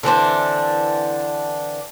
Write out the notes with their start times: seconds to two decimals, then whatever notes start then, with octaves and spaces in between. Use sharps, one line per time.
0.03 D3 E3 C4 D4